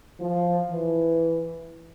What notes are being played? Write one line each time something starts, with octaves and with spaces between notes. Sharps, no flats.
F3
E3